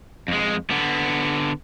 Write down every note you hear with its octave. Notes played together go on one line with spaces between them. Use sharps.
F2 G#3
D3 B3